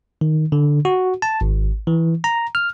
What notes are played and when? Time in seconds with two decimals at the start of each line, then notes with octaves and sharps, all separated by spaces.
0.21 D#3
0.52 D3
0.85 F#4
1.22 A5
1.41 G#1
1.87 E3
2.24 A#5
2.55 F6